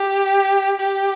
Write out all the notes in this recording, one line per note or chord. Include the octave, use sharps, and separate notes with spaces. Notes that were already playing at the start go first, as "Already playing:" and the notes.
Already playing: G4
G4